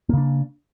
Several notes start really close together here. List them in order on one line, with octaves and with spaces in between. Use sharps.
A#3 C#3 D4